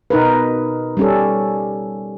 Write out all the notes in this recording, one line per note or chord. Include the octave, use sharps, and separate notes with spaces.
B2 D#4 A#4 B4
G3 C#4 A4